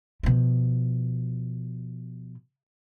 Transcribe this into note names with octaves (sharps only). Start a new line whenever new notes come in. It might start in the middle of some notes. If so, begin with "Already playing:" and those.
B2 F3